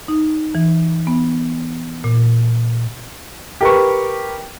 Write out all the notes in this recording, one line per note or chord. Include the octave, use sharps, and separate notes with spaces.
D#4
E3
B3
A#2
G4 A#4 B4 C#6